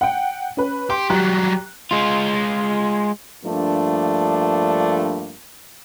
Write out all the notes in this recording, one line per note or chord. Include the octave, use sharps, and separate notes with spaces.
F#5 G5
C#4 B4
G4 C6
F#3 G3 G4 A#5 F#6
G#3 F4
G2 F3 A3 A#3 D4